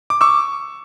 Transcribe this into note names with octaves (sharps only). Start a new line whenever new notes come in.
D6
C#6 D6 E6